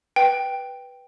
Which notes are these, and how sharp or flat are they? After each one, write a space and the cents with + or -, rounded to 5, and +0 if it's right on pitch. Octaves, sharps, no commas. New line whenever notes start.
B4 -5 G5 +0